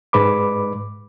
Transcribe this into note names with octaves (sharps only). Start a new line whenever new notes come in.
G#2 G#3 B4 B5 D6